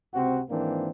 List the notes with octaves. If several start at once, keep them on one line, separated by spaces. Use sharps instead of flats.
C#2 C3 C4 F#4
G#2 D#3 E3 A#3 C4 D4